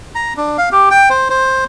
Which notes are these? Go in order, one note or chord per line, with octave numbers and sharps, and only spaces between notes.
A#5
D4
F5
G4
G5
C5
C5